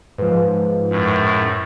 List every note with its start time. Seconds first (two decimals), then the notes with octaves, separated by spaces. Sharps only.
0.18 G#2 F3 B4
0.90 F#2 A2